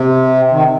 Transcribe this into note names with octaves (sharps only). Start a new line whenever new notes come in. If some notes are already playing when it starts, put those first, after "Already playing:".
Already playing: C3
D#3